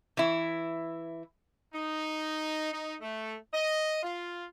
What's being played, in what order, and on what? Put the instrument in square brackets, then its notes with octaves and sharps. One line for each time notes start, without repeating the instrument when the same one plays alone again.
[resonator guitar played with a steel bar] E3 E4
[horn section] D#4
D#4
A3
D#5
F4